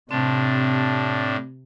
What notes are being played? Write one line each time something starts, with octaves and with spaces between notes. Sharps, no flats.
A2 C3 C4 D4